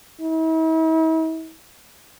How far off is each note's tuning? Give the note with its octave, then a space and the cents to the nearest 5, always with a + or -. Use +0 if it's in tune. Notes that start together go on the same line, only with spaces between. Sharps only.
E4 -45